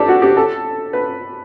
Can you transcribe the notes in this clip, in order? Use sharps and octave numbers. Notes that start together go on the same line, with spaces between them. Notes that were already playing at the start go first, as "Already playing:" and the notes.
Already playing: D4 G4 A4
F#4
G4
A4
B4